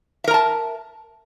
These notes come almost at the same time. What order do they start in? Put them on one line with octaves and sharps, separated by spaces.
E5 A#4 A#5 A5